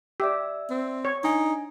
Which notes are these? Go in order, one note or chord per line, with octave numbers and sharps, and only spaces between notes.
G4 D5 E5 E6
C4
C#5
D4 D#4 G#5